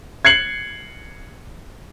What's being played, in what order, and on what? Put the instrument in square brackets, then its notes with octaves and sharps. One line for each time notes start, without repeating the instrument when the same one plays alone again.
[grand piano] G#6 C7 C#7 F#7